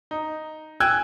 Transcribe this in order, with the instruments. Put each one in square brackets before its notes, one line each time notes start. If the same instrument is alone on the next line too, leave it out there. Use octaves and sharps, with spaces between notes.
[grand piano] D#4
G5 G#5 E6 F#6 G#6